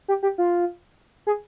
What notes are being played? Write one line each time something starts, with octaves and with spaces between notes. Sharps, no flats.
G4
G4
F4
G#4